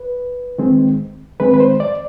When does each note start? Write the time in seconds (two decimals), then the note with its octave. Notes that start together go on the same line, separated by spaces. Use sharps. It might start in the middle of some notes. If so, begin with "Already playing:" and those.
Already playing: B4
0.58 D#3 G#3 C4
1.40 D#3 G#3 C4 B4
1.54 B4
1.60 C5
1.80 D5